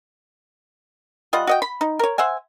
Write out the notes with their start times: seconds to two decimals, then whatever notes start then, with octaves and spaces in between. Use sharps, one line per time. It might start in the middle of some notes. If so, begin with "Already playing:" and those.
1.33 G3 F4 D#5 F#5
1.47 F#4 D#5 G5
1.62 B5
1.81 D#4
1.99 A#4 C#5
2.18 C5 E5 F#5 G#5